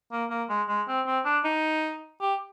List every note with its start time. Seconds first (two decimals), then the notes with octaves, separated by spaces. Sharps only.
0.12 A#3
0.30 A#3
0.49 G#3
0.68 G#3
0.88 C4
1.06 C4
1.25 D4
1.44 D#4
2.21 G4